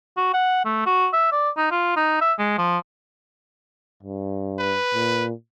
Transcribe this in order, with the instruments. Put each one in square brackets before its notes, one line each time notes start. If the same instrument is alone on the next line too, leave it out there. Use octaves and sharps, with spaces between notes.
[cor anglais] F#4
F#5
A3
F#4
E5
D5
D#4
F4
D#4
E5
G#3
F3
[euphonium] G2
[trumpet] B4
[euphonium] A#2